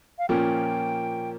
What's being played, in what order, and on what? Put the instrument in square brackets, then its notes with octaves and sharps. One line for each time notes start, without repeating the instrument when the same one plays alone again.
[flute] F5
[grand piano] A#2 F3 A#3 C#4 [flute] G5